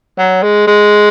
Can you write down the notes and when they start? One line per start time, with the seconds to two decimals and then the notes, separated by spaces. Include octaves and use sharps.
0.18 F#3
0.43 G#3
0.67 G#3